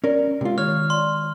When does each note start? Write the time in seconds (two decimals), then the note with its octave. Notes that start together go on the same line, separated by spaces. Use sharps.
0.04 C#4 A#4 D5
0.41 C3 G#3 F4
0.58 D#3 C#5 F6
0.90 D5 C6